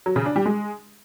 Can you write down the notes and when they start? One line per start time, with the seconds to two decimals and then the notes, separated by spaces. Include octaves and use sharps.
0.06 F#3
0.16 C#3
0.26 D4
0.36 G3
0.46 G#3